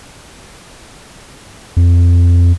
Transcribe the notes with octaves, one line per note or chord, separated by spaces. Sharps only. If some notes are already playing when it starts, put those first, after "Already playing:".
F2